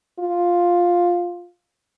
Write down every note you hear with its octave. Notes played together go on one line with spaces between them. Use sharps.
F4